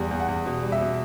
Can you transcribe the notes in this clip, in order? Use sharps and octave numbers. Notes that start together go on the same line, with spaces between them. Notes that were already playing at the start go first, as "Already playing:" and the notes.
Already playing: E2 G3
E2
F#5
E2
B2
G3
E5
B2